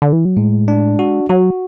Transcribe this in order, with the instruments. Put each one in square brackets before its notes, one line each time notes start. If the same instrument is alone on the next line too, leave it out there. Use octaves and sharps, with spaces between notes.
[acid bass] D3
E3
F#3
[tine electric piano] A2 [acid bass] G#3
[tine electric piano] D4
F#4
[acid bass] F#3 [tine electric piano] F#4